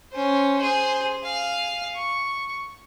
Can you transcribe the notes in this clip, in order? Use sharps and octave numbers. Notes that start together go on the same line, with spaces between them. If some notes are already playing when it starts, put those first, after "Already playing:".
C#4 C5
G#4 C5
G#4 F5
C#6